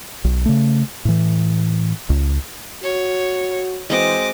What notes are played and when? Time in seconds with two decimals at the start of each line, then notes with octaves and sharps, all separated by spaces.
0.24 B1
0.46 C#3 A3
1.05 A2 E3
2.10 C#2
2.83 F#4 C#5
3.90 E3 G#3 C4 F#4 D#5 D6